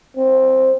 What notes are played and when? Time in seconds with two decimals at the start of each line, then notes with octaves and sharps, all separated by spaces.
0.17 C4